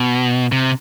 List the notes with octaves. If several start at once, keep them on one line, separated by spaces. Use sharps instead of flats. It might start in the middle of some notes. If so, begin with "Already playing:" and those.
Already playing: B2
C3